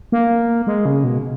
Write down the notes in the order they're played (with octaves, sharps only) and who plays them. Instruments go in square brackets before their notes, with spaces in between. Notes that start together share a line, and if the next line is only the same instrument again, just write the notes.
[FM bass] A#3
G#3
C#3
B2